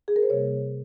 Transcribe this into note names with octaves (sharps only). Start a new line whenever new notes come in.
G#4
A#4
C5
C3 G3 A#3 C#5